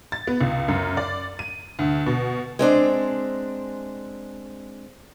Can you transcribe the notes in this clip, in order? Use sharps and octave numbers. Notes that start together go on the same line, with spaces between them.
A6
B3
C#2
F#2
D5
D#7
D2
B2
G#3 C4 D4